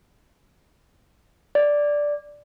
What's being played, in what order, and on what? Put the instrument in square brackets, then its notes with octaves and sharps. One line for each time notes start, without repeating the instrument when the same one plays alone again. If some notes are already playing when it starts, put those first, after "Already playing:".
[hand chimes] D5